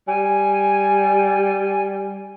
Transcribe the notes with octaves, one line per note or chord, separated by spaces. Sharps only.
G3 G#5